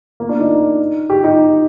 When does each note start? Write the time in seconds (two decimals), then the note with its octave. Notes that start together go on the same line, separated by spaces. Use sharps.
0.20 A#3
0.29 D4
0.40 D#4
1.10 G4
1.24 D#4